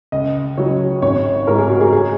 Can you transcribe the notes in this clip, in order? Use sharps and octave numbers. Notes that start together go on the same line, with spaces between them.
C#2 D#5
C#3 F#3 C#5
G#1 C#5
G#2 G#3 A#4
G#4
F#4
G#4
G#4